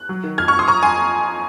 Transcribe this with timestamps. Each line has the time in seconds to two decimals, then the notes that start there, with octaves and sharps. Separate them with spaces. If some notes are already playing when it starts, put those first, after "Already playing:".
Already playing: F#6
0.09 F#3
0.24 D#3
0.38 F2 F6 G#6
0.48 C#6 F6
0.53 F2
0.59 C6 D#6
0.68 F2 A#5 C#6
0.83 F2 G#5 C6